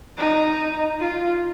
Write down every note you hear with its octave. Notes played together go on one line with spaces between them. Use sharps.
D#4
F4